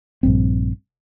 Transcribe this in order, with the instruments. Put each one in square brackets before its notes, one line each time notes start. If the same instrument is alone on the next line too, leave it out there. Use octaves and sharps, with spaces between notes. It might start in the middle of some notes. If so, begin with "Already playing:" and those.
[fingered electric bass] A#1 G2 C4